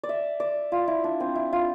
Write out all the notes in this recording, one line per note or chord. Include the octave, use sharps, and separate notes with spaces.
D5
E5
D5
F4
E4
D4
C4
E4
F4